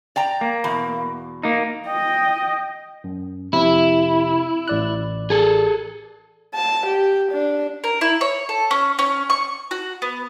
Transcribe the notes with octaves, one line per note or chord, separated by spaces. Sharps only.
D5 G5 A#5
A#3
E2 B2
A#3 D#4
D#5 G5
F#2
F2 C3 E4
A1 D5 F#6
G#4 A4
A5
G4
D4
A#4
E4
C#5
A4
C#4
C#4
C#6
F#4
B3